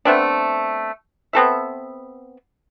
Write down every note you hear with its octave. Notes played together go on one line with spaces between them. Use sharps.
A3 B3 C4 D4
B3 C4 A4 E5